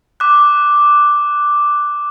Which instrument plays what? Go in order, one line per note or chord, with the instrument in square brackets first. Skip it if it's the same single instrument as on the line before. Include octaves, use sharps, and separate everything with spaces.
[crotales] D6 F#6